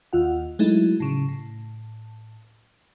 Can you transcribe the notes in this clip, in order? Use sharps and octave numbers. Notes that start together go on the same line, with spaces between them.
D#2 F4 F#5
F#3 G#3 A3 D#4 E4
A2 C#3
A2